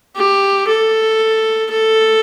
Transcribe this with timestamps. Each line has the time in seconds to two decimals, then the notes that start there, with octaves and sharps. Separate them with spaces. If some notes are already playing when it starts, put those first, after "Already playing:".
0.17 G4
0.68 A4
1.72 A4